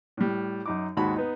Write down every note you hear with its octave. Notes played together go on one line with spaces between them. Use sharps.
A2 G3
F#2 D#4 D6
D#2 G#2 F#4 A5 B5
B3 D#4